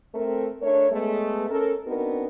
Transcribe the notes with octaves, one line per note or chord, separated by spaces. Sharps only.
A3 C4 A#4
A3 D4 A#4 C#5
G#3 A3 B3
C#4 A4 A#4
B3 C4 D4 D#4 F#4 A#4